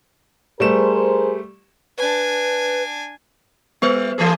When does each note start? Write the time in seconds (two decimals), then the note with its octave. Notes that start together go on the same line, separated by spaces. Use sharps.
0.60 G3 A3 G#4 A#4 C5 E7
1.98 D4 B4 G#5
3.82 G3 B3 B4 C5
4.18 E3 A3 G#4